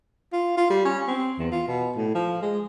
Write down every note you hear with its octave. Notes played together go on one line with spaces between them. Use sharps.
F4
F4
G3
C#4
C4
E2
F4
B2
A2
F3
G#3